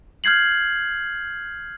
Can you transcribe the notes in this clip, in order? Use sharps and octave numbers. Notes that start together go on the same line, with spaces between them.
F6 G6 G#6 C7 F#7